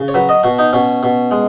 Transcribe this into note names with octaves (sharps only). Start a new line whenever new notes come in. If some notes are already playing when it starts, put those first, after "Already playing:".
Already playing: C#3
C#5
F#3 B4
D#5
B2 F#4
D#4
B2 C#4
B2
G#3